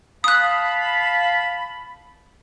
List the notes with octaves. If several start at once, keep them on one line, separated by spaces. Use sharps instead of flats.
F5 A5 B5 D#6 F#6